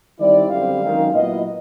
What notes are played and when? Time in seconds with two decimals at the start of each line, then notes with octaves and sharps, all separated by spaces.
0.19 D#3 G3 C4 E4 D5
0.50 F#2 D3 G3 C4 F5
0.81 F#2 D#3 G#3
1.13 A#2 F#3 B3 E4 D#5